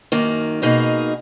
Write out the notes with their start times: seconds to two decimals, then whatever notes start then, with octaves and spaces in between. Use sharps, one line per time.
0.12 F#2 D#3 A#3
0.62 B2 A#3 D#4 G#4